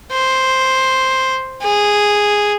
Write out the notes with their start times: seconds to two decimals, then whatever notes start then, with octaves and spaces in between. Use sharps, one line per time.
0.12 C5
1.63 G#4